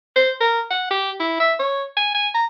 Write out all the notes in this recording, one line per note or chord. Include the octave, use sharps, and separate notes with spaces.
C5
A#4
F#5
G4
E4
E5
C#5
G#5
G#5
A#5